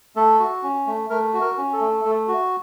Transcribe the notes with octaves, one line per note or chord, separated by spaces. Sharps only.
A3 A4
F#4
C#4
A3
A3 A#4
F#4
A#4
C#4
A4
A3
A3
F#4